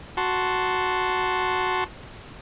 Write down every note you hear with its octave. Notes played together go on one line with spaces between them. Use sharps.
F#4 A5 C6